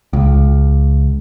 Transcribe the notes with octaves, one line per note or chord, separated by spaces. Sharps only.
C#2